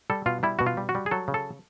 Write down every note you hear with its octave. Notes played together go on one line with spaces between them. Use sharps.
G3 A4
B2 F4
G3 E4
B2 F#4
F4
G3
F#4
G3
G#4
F#3 A4
C#3
A4